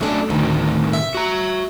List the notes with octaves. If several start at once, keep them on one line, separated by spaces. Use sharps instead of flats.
F#3 A3 C#4 D4 A4
D2 A2 C3 D#3
E5
F#4 A#5